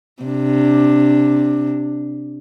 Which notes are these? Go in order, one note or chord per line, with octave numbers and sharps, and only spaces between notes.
C3 D4